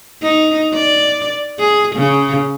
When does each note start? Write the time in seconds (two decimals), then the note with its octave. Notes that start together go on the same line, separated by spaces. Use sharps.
0.22 D#4
0.74 D5
1.60 G#4
1.96 C#3